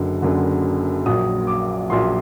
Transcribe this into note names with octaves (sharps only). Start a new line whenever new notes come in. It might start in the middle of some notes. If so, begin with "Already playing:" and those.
Already playing: F#1 F#2 D3 F#3
F#1 F#2 D3 F#3
A#1 A#2 F#3 D#6
D6
A#1 A#2 F#3 C6